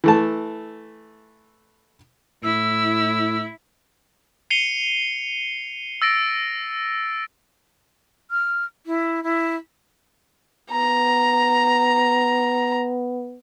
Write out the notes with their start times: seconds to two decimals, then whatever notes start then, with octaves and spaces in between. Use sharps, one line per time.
0.04 E3 A3 A5
2.44 A2 E4 E6
4.50 C7 C#7 D#7 F7 G7
6.02 E6 A6 A#6 D7
8.30 F6
8.86 E4
9.23 E4
10.71 B3 A#5